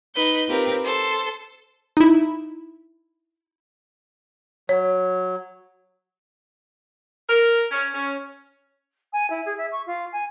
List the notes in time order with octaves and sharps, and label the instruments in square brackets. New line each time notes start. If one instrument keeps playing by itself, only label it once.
[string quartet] D#4 B4 G6
C4 F4 G4 A#4 B4
A4 C5
[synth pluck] D#4 E4
[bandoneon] F#3 [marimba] C#5
[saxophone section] A#4
C#4
C#4
[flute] G#5
E4
G#4
E5
C#6
F4
G#5